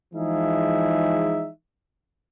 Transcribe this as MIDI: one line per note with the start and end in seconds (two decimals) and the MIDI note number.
0.14 1.49 52
0.14 1.49 53
0.14 1.49 56
0.14 1.49 63
0.14 1.49 68
0.14 1.49 76